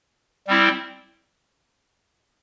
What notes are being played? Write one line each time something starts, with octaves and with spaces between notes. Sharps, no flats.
G3 C4 E4